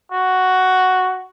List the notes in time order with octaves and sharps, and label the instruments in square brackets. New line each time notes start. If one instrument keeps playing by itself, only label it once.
[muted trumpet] F#4